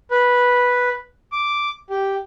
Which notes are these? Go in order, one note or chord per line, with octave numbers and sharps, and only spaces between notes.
B4
D6
G4